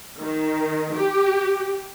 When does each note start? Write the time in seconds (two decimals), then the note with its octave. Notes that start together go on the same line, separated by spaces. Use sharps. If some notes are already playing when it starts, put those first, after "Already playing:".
0.19 D#3
0.92 G4